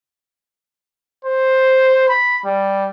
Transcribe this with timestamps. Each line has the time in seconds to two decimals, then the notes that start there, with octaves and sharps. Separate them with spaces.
1.25 C5
2.09 B5
2.45 G3